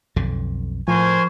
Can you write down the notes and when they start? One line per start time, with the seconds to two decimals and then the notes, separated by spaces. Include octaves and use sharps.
0.16 B1 F2 D3
0.88 A2 F3 A#4 C5 G#5 C#6